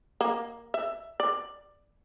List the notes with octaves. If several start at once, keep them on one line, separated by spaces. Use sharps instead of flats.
A#3
E5
D5